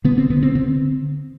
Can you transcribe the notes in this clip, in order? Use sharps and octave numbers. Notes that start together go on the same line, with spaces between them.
D3 B3
C4
D3 B3
C4
D3 C4